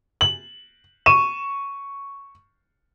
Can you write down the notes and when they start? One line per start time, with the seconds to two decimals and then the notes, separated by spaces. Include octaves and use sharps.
0.21 F#7
1.06 C#6 D#7 E7